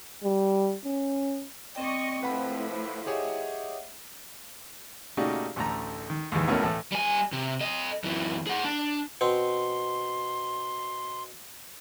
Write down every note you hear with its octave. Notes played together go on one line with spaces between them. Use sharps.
G3
C#4
C4 D5 D#5 G5 C#6
A2 F3 E4 B4 F#5 B5
G4 G#4 C#5 D#5 E5 F#5
A#2 C#3 A3 D#4 F#4 G4
A1 D2 A3 A#5
D#3
D#2 G#2 D#3 E3
C#2 B2 A3 C#4 E4 A#4
A2 E3 A3
G3 G#5
C3
A4 D#5
F#2 E3
G#4 F#5
D4
B2 C4 C6